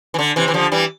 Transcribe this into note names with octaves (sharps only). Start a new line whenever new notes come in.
E3
D3
C3 E3
E3
D3 F3
E3 G3